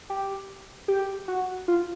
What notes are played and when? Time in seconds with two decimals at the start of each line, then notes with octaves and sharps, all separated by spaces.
0.10 G4
0.88 G4
1.28 F#4
1.68 F4